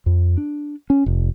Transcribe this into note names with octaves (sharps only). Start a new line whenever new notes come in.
F2
D4
C#4
F1